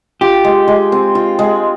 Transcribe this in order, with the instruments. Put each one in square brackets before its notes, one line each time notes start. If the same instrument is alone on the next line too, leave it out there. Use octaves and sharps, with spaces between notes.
[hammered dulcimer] F4 [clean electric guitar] G4
[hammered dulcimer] G#3
G#3
C4
F4
G#3